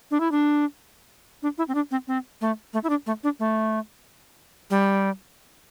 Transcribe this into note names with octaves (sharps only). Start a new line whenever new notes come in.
D4
E4
D4
D4
E4
C4
D4
C4
C4
A3
A3
E4
D4
A3
D4
A3
G3